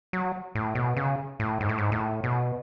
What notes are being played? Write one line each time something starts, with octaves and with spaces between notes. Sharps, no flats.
F#3
A2
B2
C#3
A2
G#2
A2
G#2
A2
B2